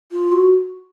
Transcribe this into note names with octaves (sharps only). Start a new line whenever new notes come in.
F4
F#4